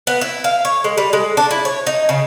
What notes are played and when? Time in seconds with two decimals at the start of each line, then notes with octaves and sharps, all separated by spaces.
0.07 B3
0.21 E4
0.44 F5
0.65 C#5
0.84 G#3
0.97 G3
1.13 G#3
1.37 D4
1.51 E4
1.65 C#5
1.87 D#4
2.09 C#3